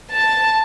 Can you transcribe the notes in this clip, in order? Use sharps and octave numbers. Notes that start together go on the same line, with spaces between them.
A5